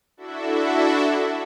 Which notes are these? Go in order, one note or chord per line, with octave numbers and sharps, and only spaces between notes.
D4 E4 F#4 A4 E5